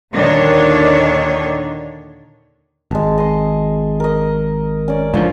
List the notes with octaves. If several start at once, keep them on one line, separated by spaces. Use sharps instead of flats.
D#2 A#2 D3 D#3 D4 C#5
G#1 G#3 A5
D#5 C6
A#4 D#5
C#4 D5
G#2 D3 F3 F4 C5 C#5